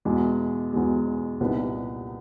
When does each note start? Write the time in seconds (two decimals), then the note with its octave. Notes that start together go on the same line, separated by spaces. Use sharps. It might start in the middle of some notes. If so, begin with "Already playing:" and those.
0.05 E2 B2 G#3
0.73 E2 B2 G#3
1.40 C2 A#2 G3 B3 D#4